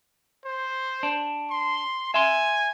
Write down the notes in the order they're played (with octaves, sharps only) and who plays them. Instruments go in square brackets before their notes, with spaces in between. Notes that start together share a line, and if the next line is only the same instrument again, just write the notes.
[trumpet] C5
[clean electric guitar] D4
[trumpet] C6
[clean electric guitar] E5 C6 [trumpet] G#5